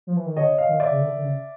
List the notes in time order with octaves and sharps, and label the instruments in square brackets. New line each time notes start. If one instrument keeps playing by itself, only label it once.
[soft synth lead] F3
E3
D#3
[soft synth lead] D3 [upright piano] C#5 D#5
[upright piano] D#5 F5
[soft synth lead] D#3
[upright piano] D5 E5
[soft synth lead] C#3
D3
D3
C#3